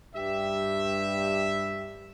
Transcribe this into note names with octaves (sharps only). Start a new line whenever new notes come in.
G2 G4 E5